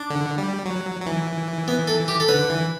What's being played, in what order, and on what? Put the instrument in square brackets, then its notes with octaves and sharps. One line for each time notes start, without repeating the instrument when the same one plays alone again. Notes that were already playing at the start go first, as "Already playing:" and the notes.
Already playing: [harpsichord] D4
[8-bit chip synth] D3
G3
F#3
F#3
E3
[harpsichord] B3
A4
G4
A4
[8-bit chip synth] D3 [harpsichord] B4
[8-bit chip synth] E3